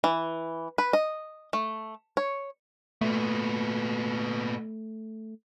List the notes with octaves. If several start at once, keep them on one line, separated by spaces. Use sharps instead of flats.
E3
B4
D#5
A3
C#5
A#2 A3 B3